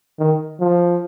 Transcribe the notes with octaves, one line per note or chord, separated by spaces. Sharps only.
D#3
F3